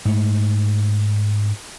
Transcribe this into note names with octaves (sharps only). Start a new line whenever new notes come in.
G#2 A3